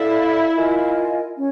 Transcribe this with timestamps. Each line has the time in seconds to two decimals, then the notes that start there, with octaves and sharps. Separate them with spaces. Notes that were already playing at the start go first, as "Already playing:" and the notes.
Already playing: E4 A4 D5 F5
0.55 F4 A#4 D#5 G#5
1.36 C#4